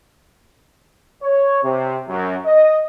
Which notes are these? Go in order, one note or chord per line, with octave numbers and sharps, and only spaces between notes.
C#5
C3
F#2
D#5